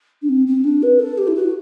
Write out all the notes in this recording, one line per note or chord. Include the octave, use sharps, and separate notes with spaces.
D4
C4
C4
D4
B4
A4
G4
E4
F#4